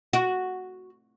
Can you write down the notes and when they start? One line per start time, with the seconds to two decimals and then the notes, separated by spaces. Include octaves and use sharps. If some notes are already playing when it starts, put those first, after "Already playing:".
0.13 F#4